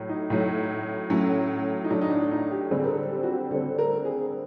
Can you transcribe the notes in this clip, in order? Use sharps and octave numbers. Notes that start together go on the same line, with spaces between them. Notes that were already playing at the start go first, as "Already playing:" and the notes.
Already playing: A2 F#3 A3
D#4
A2 F#3 A3
A2 F#3 A3 C#4
D#4
A2 F#3 A3 D4
D#4
D4
D#4
G4
D3 G3 C4 G#4
A#4
A4
G4
F#4
G4
D3 G3 C4 A4
A#4
G#4